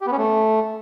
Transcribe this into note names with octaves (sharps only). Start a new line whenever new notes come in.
G4
B3
C#4
A3